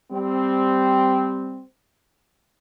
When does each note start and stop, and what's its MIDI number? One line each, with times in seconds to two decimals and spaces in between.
0.12 1.62 55
0.12 1.62 60